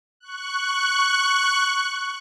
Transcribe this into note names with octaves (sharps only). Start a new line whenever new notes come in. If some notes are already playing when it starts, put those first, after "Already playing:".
C#6 F#6